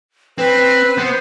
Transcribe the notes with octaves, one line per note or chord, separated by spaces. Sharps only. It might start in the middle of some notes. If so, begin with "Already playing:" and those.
C4 B4
B3 C5